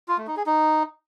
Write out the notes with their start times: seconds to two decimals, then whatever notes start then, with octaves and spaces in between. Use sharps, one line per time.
0.08 F4
0.18 A3
0.27 D#4
0.37 G#4
0.46 D#4